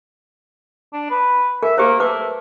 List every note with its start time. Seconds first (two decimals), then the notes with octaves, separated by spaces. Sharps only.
0.93 D4
1.10 B4
1.63 A#4 E5
1.78 A#3 G4 C5
2.00 A3 B4 D6